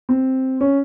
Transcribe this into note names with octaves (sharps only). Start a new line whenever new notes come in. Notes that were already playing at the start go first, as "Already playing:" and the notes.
C4
C#4